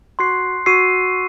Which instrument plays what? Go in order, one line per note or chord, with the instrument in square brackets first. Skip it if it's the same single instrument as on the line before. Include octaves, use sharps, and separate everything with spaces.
[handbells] F#4 [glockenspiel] C6 F#6 C7
[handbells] F#4 [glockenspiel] E6 C7 D#7